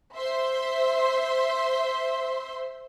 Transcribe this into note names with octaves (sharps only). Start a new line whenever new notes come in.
C5 E5 C6